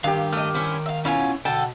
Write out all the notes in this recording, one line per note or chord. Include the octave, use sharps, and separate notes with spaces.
G2 D#3 G4 F5
A3 D#5 D6 F6
C#4 E4 C5
E5 F5
B2 C#4 E4 F4 C#5 G#5
B2 D3 A4 G5 A5